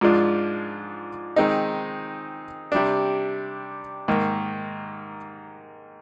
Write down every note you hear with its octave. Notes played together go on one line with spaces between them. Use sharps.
G#2 F3 G#3 D4 F4
D#3 G#3 C4 D#4
C3 G3 D4
G#2 D#3 A#3